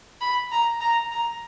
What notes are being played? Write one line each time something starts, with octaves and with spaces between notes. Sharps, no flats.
B5
A#5
A#5
A#5